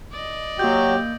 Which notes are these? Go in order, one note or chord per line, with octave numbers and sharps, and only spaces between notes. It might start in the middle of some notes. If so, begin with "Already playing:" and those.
D5 D#5
F#3 A#3 F#4 G4 G5 G6